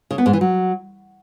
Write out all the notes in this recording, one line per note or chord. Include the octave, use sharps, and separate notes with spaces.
C#3
B3
G#2
E3
F#3